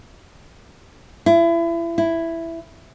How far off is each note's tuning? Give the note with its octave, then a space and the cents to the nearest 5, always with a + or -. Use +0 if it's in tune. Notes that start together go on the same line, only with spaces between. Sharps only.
E4 +30
E4 +5